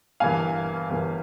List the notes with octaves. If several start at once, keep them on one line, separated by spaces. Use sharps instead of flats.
G1 G2 E3 A#3 F5 G#5
G1 G2 E3 A#3